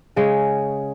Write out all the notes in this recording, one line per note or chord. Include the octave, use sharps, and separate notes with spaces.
C#3 G#3 C#4 G#4